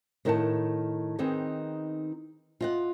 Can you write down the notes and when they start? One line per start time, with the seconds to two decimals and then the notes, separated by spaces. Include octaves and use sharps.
0.25 A2 D#3 A#4 C#5 F#5 A5
1.19 D#3 B3 C4 D#4 G#4
2.61 F4 D#5 F#5